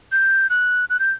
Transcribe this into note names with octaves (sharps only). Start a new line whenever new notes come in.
G6
F#6
F#6
G6